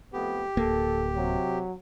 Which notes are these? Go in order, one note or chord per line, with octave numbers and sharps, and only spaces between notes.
F2 A3 B3 G4
D1 A#3 A4
C3 F#3